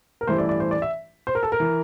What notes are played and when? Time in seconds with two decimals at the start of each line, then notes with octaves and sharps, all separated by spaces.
0.21 A#4
0.27 A1 G2 E3 A3 E4 C5
0.38 D5
0.49 D5
0.60 C5
0.71 D5
0.82 E5
1.27 C5
1.35 A#4
1.43 A4
1.52 A#4
1.60 E3